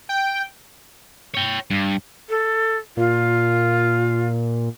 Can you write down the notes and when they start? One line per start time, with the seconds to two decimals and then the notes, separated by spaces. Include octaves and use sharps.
0.09 G5
1.35 C#5 G5
1.71 G2
2.29 A4
2.97 A#2 F4